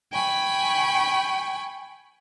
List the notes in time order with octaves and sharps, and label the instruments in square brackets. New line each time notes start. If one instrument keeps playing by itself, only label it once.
[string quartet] G5 G#5 B5 C#6